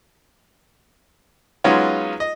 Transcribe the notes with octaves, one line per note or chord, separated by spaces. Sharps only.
F#3 G#3 B3 C#4 D#4 F4
D#5